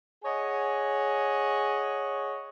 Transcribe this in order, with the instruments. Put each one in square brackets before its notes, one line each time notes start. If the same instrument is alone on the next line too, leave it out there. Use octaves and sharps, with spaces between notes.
[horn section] G#4 C#5 D#5 F#5 G#5